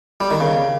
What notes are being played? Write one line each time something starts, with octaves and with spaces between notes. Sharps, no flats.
G3
D#3
C#3